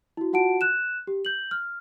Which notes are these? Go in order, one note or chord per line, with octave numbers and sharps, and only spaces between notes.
E4 F#4
F4 F#4 F#5 A5 D7
F#6 E7
G4
G6 F#7
F6